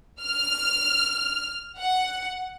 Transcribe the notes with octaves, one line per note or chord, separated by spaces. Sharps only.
F6
F#5